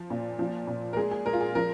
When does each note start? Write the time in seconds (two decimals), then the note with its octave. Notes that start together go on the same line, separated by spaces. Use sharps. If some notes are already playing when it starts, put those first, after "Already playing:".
Already playing: F3
0.10 A#2
0.39 F3
0.67 A#2
0.93 A#4
0.97 G#3 G#4
1.11 G#4
1.26 G#3 A#4
1.33 F4
1.41 G#4
1.55 F3 A#4